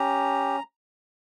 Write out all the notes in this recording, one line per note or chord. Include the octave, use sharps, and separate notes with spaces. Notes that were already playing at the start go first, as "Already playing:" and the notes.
Already playing: C#4 G4 A#5